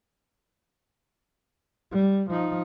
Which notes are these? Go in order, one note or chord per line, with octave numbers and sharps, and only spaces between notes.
G3
F3 D#4